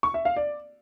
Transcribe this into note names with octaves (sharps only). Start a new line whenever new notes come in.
C#6
E5
F5
D5